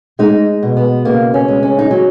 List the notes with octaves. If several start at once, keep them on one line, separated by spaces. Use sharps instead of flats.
G#3 D#4
B2
B3
C#3 A#3
C#4
G#3
C#4
D#4
F#3 C#4